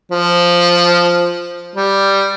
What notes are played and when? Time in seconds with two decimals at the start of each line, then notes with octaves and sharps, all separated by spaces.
0.11 F3
1.76 G3